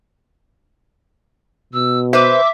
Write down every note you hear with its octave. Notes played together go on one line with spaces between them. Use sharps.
B2 E6
B4 C5 E5 D6